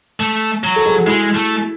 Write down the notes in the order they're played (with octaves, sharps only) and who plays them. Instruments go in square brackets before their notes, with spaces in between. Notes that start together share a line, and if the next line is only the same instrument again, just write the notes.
[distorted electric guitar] A3
F#3
[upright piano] A4
G#4
F#4
[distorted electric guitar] G#3 [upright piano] E4
[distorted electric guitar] A3